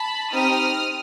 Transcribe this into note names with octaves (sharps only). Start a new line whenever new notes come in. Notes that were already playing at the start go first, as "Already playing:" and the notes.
Already playing: A5 B5
C4 D#4 G4 D#6 F6